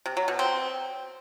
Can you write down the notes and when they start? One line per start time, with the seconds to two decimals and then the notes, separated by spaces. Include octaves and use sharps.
0.06 C3
0.17 F#3
0.28 B2
0.39 C4